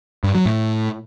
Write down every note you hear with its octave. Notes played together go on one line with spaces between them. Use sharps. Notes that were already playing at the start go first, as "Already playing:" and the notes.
G2
F#3
A2